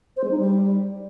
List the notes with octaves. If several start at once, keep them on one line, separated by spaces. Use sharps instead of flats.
C5
G#3
D#4
G3